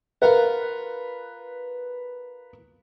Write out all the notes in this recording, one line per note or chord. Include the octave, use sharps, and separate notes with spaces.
F4 A#4 B4 F#5